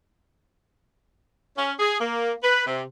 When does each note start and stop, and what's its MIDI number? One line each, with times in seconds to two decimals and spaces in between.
1.58 1.72 61
1.80 2.01 68
2.01 2.33 58
2.44 2.64 71
2.67 2.82 48